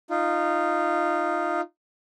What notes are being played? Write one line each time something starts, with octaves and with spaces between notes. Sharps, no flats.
D#4 F4